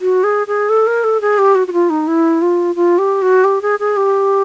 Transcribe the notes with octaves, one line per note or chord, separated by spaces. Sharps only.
F#4
G#4
G#4
A4
A#4
A4
G#4
G4
F#4
F#4
F4
D#4
E4
F4
F4
G4
F#4
G4
G#4
G#4
G4